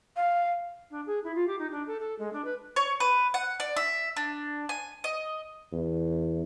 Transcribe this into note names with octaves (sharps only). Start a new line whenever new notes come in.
F5
D4
G#4
E4
F4
G4
D#4
D4
A4
A4
G#3
D4
B4
C#5
B4
F#5
D5
E5
D4
G#5
D#5
E2